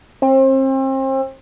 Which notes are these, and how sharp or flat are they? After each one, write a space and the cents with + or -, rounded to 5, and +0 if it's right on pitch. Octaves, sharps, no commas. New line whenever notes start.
C4 +35